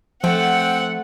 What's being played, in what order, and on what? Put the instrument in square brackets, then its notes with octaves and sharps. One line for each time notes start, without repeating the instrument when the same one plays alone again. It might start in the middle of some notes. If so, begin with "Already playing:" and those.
[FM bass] F3 [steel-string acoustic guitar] A3 [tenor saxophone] C4 [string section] F#5